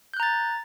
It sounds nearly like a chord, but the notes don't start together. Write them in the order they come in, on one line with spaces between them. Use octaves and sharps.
G6 F#6 A#5 A6